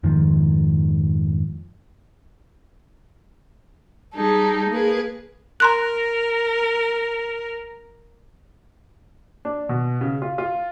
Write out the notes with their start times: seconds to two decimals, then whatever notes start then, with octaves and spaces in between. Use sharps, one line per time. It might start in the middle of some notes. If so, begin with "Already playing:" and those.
0.03 F2 G#2 D#3 F3
4.15 G3 D#4 G#4 A4
4.70 A#3 G#4 B4
5.60 A#4 A#5 C6 F#6
9.45 D4
9.69 B2
10.01 C#3
10.22 F4
10.38 F4